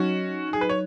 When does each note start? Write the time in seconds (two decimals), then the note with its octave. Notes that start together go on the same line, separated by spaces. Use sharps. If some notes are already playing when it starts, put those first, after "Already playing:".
Already playing: F#3 C#4 D#4 F#4
0.53 G#4
0.61 B4
0.69 C#5